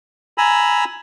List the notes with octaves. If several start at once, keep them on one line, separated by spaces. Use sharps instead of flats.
G#5 A#5 B5 E6